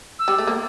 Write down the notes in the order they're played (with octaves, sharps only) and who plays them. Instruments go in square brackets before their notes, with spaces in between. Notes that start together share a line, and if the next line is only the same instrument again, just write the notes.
[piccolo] E6
[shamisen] G3
A3
A#3